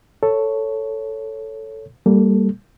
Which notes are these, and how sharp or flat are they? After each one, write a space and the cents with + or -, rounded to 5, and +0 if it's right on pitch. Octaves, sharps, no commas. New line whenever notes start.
A4 +5 C#5 +0
G3 +5 A#3 -20 A4 +0